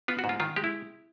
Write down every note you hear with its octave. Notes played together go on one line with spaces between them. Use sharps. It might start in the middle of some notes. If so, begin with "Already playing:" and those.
B3 F4
F#4
G#2
F4
D#3 F4
G#3 G4
E4